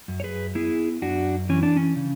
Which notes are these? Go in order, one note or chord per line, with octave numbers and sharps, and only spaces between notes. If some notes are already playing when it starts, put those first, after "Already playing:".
F#2
C#5
G#4 B4
B3 E4 G#4
F#2 D4 F#4
E3 C#4
D4
C#4
C#3